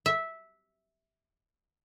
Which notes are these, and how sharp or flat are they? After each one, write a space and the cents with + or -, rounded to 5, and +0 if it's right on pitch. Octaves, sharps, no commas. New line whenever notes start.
E5 -10